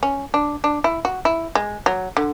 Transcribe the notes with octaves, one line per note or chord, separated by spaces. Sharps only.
C#4
D4
D4
E4
F#4
E4
G#3
F#3
D3